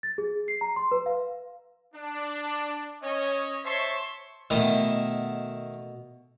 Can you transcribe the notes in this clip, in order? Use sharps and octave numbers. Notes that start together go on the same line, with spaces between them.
A6
G#4
C7
A#5
C6
B4
F5
D4
C#4 C#5 D#5
C5 C#5 E5 A5 C6 C#6
B2 D#3 A3 E4 D#5